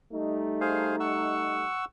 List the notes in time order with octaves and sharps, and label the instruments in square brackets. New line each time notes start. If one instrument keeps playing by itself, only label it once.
[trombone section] G3 A3 D#4
[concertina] G#4 C5 F5
F#5 C#6 E6